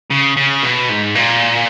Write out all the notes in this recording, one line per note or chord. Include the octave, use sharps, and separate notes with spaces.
C#3
C#3
B2
G#2
A#2